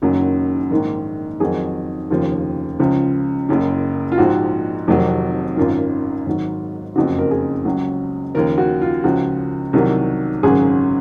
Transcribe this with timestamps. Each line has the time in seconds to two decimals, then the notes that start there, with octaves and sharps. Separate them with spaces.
0.02 F#1 F#2 D#3 F#3
0.71 A#1 G#2 D#3
1.40 F2 D#3 F#3 G#4
2.10 F1 D#2 C#3 F3
2.79 C#2 C#3 F3
3.49 F#1 F#2 C#3
4.12 F4
4.18 A#1 G#2 F3 F#4
4.87 F1 F2 C3 D#3 F#3
5.57 G#1 F#2 D#3 F4
6.26 G#1 G#2 F#3
6.96 F#1 F2 C#3 F#4
7.19 A#4
7.31 G#4
7.65 C#2 C#3 F#3
8.34 D#2 C#3 F3 A#4
8.58 F#4
8.82 F4
9.04 C#2 C#3 F3 F#4
9.73 C2 C3 D#3 F#3
10.43 G#1 F#2 C#3 F#3 G#4